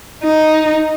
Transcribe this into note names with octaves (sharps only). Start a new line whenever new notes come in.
D#4